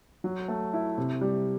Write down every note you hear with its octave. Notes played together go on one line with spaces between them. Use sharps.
F#3
A3
E4
C3
G3